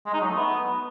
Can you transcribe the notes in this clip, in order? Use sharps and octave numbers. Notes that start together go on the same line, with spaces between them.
G#3
D#4
F#3
A3
B3